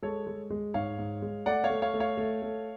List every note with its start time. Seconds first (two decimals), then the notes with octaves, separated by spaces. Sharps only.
0.03 G#3 A4 C#5
0.27 G#3
0.50 G#3
0.74 G#2 C#5 F5
0.98 G#2
1.22 G#3
1.46 A3 D5 F#5
1.64 C#5 F5
1.70 A3
1.82 C#5 F5
1.94 A3
2.00 C#5 F5
2.17 A3
2.42 A3